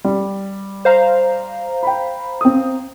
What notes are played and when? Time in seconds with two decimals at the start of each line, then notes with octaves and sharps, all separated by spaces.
0.04 G3
0.85 C5 F5 A#5
1.83 G5 B5
2.41 C4 D#6